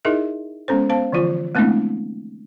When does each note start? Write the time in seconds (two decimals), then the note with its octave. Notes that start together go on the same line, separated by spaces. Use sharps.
0.05 D#4 E4 G#4 A#4 D#5 E5
0.68 G#3 B3 C#4 A4 C5
0.90 B3 C5 F5 A5
1.12 D3 E3 F3 F4 C5
1.55 G#3 A3 B3 C4 D4 E4